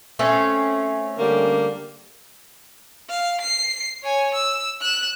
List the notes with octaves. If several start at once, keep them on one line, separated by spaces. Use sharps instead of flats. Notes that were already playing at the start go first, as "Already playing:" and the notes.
A3 C4 C#4
D3 G3 A#3
F5
C7
C#5 G#5
E6
F#6 E7